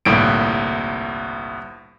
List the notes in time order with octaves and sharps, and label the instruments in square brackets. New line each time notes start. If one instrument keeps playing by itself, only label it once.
[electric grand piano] G1 C2 A2 A#3 D7